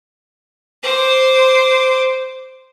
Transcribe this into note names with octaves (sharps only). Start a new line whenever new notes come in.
C5 D6